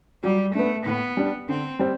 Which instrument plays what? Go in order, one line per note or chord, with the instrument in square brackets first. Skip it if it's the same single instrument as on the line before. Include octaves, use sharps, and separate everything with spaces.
[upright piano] F#3 [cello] G3
[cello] A3 [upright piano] B3 D4
[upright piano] A2 [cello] B3
[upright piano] G3 D4
[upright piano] D3 [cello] C4
[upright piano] G3 C4